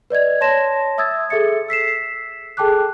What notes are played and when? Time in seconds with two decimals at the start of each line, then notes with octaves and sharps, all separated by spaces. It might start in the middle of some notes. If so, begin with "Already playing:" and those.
0.10 B4 D5 D#5 G#6
0.41 C#5 A5 C6 A#6 E7
0.98 E5 D#6 E6 G#6 A6
1.30 G#4 A4 E5 A6 C#7
1.68 E6 B6 C7 E7
2.57 G#4 A4 G5 A5 D6 F#6